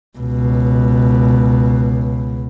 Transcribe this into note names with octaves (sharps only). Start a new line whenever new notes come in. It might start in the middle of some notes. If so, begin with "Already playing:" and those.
C#2 B2